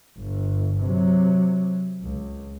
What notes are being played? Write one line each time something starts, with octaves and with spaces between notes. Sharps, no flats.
G1
C3 F#3
C#2